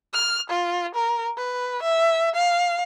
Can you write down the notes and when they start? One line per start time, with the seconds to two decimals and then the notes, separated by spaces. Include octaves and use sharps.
0.13 F6
0.50 F4
0.95 A#4
1.37 B4
1.82 E5
2.35 F5